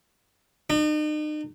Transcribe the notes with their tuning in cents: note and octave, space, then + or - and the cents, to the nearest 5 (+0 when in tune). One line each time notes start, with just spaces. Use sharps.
D#4 -40